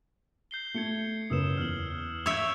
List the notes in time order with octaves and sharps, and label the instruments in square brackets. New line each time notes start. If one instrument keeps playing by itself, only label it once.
[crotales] G6 C7 G7
[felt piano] A3 [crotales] G#6 C#7 G7
[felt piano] F#1 C#3 B4 [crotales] D#6 E6 E7
[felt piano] E2 [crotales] F6 F#7
[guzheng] C#5 E5 [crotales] G6 D7 E7